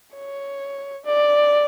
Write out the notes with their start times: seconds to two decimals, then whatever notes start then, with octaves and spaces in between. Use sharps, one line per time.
0.16 C#5
1.05 D5